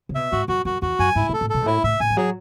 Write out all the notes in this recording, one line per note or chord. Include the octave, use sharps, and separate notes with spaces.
C#3
B2 E5
G#2 F#4
F#2 F#4
F#2 F#4
E2 F#4
F#2 G#5
G#2 E4
A2
A4
A2
B2 A4
G#2
A2 E4
A2 E5
A2 G#5
E3
F#3 G#4